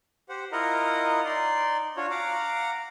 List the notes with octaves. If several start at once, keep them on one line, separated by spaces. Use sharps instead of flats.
G4 C5 F#5
E4 F4 A#4 D#5 F#5 A#5
D#4 D5 C6
D4 F4 F#4 C#5
F5 F#5 A#5 D6